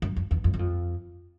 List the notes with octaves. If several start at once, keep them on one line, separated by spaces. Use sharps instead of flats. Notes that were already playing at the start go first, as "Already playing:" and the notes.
F#2
F2
E2
F2
F#2
F2